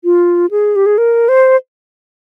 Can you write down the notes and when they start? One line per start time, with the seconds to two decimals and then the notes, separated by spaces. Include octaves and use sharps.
0.04 F4
0.51 G#4
0.76 G4
0.86 G#4
0.98 A#4
1.29 C5